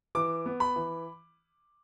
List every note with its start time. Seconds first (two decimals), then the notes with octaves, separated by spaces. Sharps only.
0.15 E3 D6
0.46 B3
0.60 B5
0.76 E3